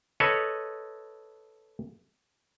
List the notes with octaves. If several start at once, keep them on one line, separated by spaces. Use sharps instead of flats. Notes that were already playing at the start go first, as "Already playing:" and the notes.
A4 B4 C#5 D#5